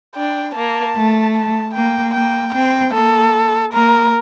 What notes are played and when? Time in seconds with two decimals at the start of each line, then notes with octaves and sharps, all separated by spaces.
0.16 D4 G5
0.55 A#3 A5
0.95 A3
1.35 A5
1.74 A#3 G5
2.14 A#3 G5
2.54 C4 G5
2.94 A#3 A4
3.73 A#3 A#4